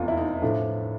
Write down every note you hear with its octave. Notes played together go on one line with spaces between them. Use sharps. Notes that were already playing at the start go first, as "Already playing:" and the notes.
Already playing: F1 E2 C3 E3 F4
E4
D#4
A2 F3 D4